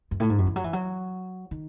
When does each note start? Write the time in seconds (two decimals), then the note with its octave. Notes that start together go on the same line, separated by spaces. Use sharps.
0.11 F#2
0.20 A2
0.30 G#2
0.38 F#2
0.47 E3
0.56 F#3
0.64 E3
0.73 F#3
1.51 D#3